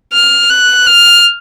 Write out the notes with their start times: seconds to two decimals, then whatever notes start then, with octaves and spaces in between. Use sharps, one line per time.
0.13 F6
0.50 F#6
0.87 F6